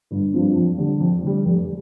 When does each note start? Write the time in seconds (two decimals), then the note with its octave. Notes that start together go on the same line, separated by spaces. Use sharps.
0.11 G1
0.34 G2 F3 C4
0.56 F2
0.78 D3 G3
1.00 F2
1.22 D3 G3
1.45 F1